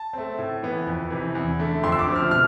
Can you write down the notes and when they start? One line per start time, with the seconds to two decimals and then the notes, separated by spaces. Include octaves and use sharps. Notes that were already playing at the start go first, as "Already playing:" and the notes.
Already playing: A5
0.13 A3 C4
0.38 A2
0.63 E3 B3
0.87 F2
1.10 C3 E3
1.35 E2
1.60 D3 A3
1.83 F2 C6
1.92 E6
1.99 D6
2.07 D3 F3 A3 C4
2.16 F6
2.31 B2 F6